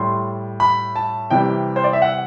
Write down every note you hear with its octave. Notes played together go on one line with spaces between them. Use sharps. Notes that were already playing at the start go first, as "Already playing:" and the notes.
Already playing: A2 G3 C6
B5
A5
C3 E3 G3 G5
C5
D5
E5
F#5